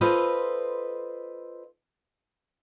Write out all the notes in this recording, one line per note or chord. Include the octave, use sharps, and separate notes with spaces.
F4 A4 B4 C5 D#5